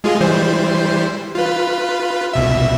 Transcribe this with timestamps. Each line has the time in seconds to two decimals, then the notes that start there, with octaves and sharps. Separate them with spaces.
0.04 G#3 F4 G#4
0.21 E3 G3 C5
1.35 F4 B4
2.33 C2 B2 E5